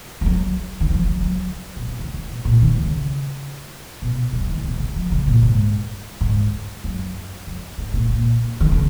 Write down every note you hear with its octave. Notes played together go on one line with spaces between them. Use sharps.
F3
F#3
D#3
F3
F#3
F#3
B2
C#3
D#3
D#3
B2
A#2
D#3
C#3
B2
F#3
F3
D#3
C#3
B2
C#3
F3
C#3
A#2
G#2
G#2
F#2
F2
G#2
A#2
A#2
D#3
C#3